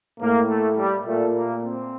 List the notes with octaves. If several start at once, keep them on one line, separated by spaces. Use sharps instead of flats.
A2 A#3
A3
G3
A#2 A3
A#3
C4